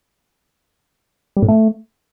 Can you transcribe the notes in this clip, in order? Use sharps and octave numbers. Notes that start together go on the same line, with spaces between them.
G3
A2
A3